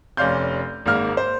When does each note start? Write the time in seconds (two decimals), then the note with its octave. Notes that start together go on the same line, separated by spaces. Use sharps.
0.17 F1 C#4 D5 F5 C6 G6
0.86 G#1 G#2 A#3 F6
1.17 C5